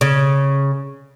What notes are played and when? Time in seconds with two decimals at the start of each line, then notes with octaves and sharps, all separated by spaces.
0.01 C#3